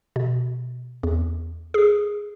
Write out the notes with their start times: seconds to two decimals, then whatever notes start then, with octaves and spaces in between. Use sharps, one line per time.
0.16 B2
1.03 E2
1.74 G#4